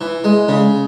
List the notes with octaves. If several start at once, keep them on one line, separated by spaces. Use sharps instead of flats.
E3
G#3
C#3